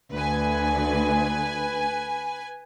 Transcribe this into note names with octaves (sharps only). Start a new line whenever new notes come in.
D2 B4 G#5